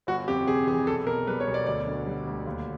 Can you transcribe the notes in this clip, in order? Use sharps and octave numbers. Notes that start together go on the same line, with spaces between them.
G1 F#4
F2 G4
C3 G#4
E3 G#4
B1 A4
B2 A#4
G3 B4
C#5
B1
D5
D2 D5
D3
G3
D2
D#2